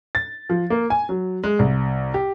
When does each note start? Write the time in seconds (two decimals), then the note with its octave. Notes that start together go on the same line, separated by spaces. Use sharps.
0.15 A6
0.50 F3
0.70 A#3
0.90 G#5
1.09 F#3
1.43 G#3
1.59 C2
2.14 G4